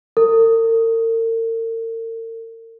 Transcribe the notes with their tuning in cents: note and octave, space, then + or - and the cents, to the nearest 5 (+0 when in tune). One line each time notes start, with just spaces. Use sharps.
A#4 -45